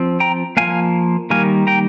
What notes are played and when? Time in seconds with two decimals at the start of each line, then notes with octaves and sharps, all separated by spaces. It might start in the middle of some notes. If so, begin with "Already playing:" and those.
Already playing: F3 C4
0.20 G5 A#5
0.57 F3 A#3 F5 G#5
1.30 D#3 G3 A#3 F5 G#5
1.67 G5 A#5